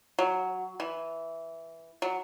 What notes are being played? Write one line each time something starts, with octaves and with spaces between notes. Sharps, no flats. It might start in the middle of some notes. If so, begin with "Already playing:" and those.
F#3
E3
F#3